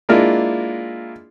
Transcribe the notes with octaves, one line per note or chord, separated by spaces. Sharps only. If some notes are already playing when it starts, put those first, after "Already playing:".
G#3 A#3 D4 E4 F4